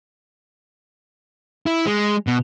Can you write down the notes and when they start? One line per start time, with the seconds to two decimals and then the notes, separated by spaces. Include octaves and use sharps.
1.66 E4
1.86 G#3
2.27 B2